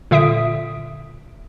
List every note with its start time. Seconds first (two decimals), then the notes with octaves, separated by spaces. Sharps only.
0.11 A#2 D3 E5 D#6 B6 D7